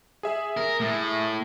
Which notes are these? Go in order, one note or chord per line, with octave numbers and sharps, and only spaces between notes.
G#4 E5
A#4
A2